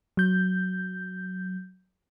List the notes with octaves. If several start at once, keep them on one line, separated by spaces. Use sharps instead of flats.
F#3 G6